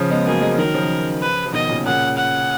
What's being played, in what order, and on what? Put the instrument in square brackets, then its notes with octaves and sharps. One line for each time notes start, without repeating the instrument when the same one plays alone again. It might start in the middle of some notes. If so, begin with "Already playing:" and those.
Already playing: [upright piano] C#3 F3
G#3 B3
[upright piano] F#3 A#3 [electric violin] G#4
[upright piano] F3 G#3
[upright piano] D#3 F#3 [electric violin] A#4
[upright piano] C#3 F3
[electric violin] B4
[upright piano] F3
[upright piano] B2 D#3 [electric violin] D#5
[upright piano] A#2 C#3
[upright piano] A#2 C#3 [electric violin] F#5
[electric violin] F#5